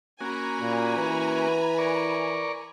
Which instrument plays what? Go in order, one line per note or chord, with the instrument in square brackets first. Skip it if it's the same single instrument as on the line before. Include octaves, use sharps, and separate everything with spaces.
[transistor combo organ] A#3 C#4 F#4 [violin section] G#5 A#5 B5
[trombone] A#2
[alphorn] E3 [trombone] B4
[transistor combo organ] A#4 D5 C#6